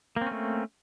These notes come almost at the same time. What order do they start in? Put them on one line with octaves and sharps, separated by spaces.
A#3 C4 C#4 A3